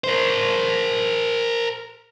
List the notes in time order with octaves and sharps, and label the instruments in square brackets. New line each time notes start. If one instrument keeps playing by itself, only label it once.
[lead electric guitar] A#4 C5